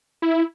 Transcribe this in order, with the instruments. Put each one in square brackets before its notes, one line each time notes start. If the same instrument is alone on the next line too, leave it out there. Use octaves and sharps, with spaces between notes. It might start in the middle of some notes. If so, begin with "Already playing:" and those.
[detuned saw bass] E4